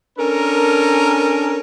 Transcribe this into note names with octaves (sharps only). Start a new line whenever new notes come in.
C#4 D4 A4 A#4